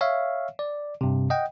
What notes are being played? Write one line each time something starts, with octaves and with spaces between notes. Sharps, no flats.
C#5 E5 F5
D5
G2 C3
D#5 F#5 G5